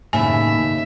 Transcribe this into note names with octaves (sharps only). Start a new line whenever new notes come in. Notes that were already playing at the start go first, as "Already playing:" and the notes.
D#2 A2 C#3 E5 G#5